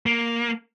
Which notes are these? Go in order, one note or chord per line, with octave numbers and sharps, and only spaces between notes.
A#3